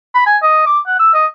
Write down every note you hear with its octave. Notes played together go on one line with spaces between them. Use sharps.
B5
G#5
D#5
D6
F#5
E6
D#5